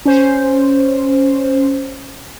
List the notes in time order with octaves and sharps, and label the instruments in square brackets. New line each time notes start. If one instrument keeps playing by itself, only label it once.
[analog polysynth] C#4 C5